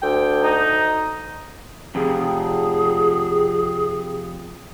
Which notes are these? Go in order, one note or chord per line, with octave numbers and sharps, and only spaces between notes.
D2 G5
D#4
F2 C3 G#4